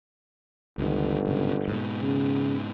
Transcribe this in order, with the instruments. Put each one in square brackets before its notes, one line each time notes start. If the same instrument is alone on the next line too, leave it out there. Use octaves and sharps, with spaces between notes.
[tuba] G1 [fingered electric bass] C#2 D#3
[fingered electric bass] B1 G#2 C#3
G#2 B2
[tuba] C#3